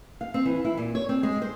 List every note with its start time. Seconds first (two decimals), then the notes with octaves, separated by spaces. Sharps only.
0.21 F5
0.34 C4
0.45 E3
0.65 E4
0.77 A#2
0.95 C#5
1.09 C4
1.23 G#3
1.42 C5